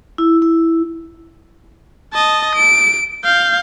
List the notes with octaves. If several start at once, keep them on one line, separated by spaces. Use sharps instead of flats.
E4
E4
D#5 A5
D7
F5 G6